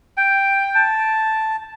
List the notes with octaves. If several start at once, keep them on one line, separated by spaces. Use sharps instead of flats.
G5
A5